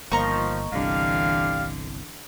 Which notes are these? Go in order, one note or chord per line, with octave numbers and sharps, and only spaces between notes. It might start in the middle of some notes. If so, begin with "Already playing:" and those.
G1 D#3 F3 A#3 D#5 A#5 C#6
G1 C2 D3 E3 G4 D5 F5